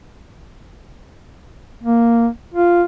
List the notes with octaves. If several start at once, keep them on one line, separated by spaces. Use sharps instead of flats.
A#3
F4